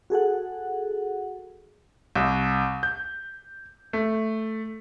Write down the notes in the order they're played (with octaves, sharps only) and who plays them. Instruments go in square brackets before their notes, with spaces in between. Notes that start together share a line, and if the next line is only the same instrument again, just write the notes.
[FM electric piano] F#4 G#4 A4 F#5
[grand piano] C2
G6
A3